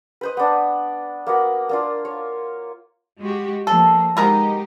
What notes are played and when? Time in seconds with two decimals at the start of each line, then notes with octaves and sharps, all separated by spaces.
0.21 B4 C5 D#5
0.37 B3 D4
1.26 A#3 B3 F#4
1.69 A#3 D4 F4
2.05 C#5
3.19 G#3 F#4 G4
3.67 F3 A#3 A4
4.17 B2 G#3 D#4 G4 A#4 A#5